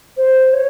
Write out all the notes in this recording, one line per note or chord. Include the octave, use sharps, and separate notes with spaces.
C5
C#5